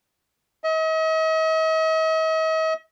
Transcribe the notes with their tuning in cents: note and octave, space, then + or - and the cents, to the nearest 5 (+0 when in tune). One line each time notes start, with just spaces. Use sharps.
D#5 +45